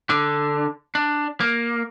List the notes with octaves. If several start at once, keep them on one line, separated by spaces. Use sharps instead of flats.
D3 D4
D4
A#3